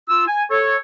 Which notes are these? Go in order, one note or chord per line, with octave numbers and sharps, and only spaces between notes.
F4 E6
G#5
A4 C#5